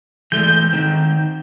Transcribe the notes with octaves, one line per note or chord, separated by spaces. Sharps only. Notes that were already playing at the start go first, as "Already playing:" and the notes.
E3 G#3 A3 G6
D#3 C4